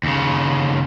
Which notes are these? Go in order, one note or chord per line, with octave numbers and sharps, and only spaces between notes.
D#2 C#3